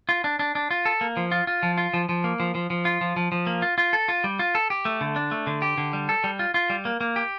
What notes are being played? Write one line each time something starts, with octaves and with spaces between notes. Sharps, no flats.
F4
D4
D4
D4
F4
A4
A#3
F3
F4
F4
F3
F4
F3
F3
A#3
F3
F3
F3
F4
F3
F3
F3
A#3
F4
F4
A4
F4
G3
F4
A4
G4
A3
D3
D4
A3
D3
G4
D3
G3
A4
G3
F4
F4
G3
A#3
A#3
G4